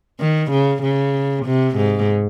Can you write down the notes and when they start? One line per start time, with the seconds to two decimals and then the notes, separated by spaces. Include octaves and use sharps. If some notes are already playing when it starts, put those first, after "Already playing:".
0.20 D#3
0.51 C#3
0.82 C#3
1.46 C3
1.77 G#2